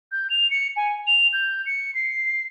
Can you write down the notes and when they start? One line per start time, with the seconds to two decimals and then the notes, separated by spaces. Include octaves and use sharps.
0.12 G6
0.30 F7
0.51 C#7
0.77 G#5
1.07 F7
1.33 G6
1.66 C#7
1.95 C7